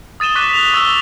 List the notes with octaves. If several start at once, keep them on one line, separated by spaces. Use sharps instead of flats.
D#6 A6 D#7 E7 G7
C#6 D6 F#6 B6 D#7
B6 F7
C#6 E6 A6 G7